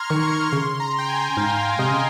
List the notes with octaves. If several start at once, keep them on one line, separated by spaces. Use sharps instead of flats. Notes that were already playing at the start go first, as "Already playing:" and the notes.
Already playing: A#5 C6 F6 G#6
D#3 C#6
C#3 C6
A#5
G5
G#5
G#2 F5
F5
C3 D#5
C#3